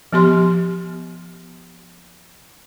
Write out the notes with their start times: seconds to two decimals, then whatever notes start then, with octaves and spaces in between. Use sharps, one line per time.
0.13 F3 B3 G4 C6